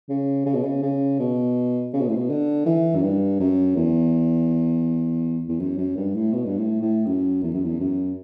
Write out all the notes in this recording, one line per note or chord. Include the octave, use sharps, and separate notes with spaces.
C#3
C#3
B2
C#3
C#3
B2
C#3
B2
A2
B2
D3
E3
F#2
G2
F#2
E2
E2
F#2
F#2
G2
A2
B2
G2
A2
A2
F#2
E2
F#2
E2
F#2